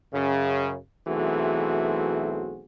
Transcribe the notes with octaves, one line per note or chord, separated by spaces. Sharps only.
F#2 C#3
B1 E3 A3 C4 F#4 G#4